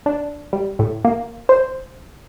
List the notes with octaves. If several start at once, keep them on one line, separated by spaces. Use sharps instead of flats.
D4
G3
A2
A#3
C5